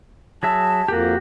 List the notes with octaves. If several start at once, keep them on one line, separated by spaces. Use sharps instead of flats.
F#3 G#4 E5 A5
F2 A#3 F#4 G4